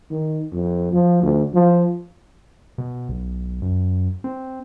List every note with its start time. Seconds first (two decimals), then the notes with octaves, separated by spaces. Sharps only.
0.11 D#3
0.53 F2
0.93 F3
1.22 D2
1.54 F3
2.78 B2
3.09 B1
3.62 F#2
4.24 C4